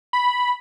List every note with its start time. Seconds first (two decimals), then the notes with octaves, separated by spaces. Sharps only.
0.13 B5